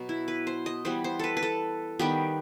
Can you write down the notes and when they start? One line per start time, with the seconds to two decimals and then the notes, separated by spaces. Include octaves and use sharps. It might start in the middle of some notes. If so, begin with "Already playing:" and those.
Already playing: B2 F#3 B3
0.09 E4
0.28 B4
0.47 C5
0.66 D#5
0.85 E3 G3 B3 C5
1.04 C5
1.19 A4 B4
1.37 B4
1.43 A4
1.99 D#3 G3 B3 G4